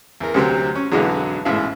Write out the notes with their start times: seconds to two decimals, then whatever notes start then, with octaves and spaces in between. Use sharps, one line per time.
0.21 E2 A#4
0.34 D2 C3 F#3 C4
0.75 C#4
0.91 B1 F2 D3 E3 F#3 G#3
1.45 A1 G#2 B2 E4 F5